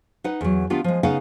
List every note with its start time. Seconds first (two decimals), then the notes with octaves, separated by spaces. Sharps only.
0.24 D#4 B4 F#5
0.41 E2 F#3
0.70 D#3 B3 D4 F4 G4
0.84 F3 G#3
1.03 C#3 B3 D#4 F5 F#5